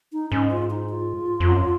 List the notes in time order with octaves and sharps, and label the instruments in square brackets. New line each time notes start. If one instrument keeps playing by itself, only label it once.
[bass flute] D#4
[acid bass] G#2 [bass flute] C#4
[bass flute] F4
D#4
F4
[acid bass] F2
F#2